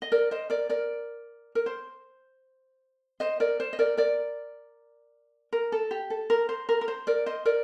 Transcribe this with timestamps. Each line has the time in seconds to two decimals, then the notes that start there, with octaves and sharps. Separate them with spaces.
0.02 D#5
0.12 A#4 D5
0.31 C5 D#5
0.50 A#4 D5
0.70 A#4 D5
1.55 A#4
1.66 C5
3.20 C5 D#5
3.40 A#4 D5
3.60 C5
3.73 D#5
3.79 A#4 D5
3.97 A#4 D5
5.53 A#4
5.72 A4
5.91 G4
6.10 A4
6.30 A#4
6.49 C5
6.69 A#4
6.81 A#4
6.88 C5
7.07 A#4 D5
7.26 C5 D#5
7.45 A#4 D5